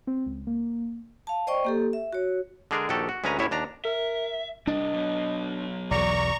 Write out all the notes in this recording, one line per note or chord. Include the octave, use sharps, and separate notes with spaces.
C4
C#2
A#3
F5 A5
C5 D5 D#5 G5 C#6
A#3 G4 A4
E5
F#4 C#5
D3 G#3 D4 G#4 A#4
A#1 D#3 F#4 G4 A4
F#4
D2 G#3 C#4 B4 G#5 A#5
A1 E2 A2 E4 C#5 E5
D#2 D4 A#5
A#4 E5
C3 G3 D4 D#5
F#3 B3
B1 E2 D5 A#5 C#6